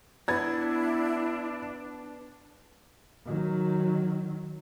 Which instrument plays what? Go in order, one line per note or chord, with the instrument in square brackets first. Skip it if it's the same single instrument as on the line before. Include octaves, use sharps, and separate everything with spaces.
[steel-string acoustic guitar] B3 [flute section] D4 [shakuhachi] E4 [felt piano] B5 G#6 A6
[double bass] D#3 F#3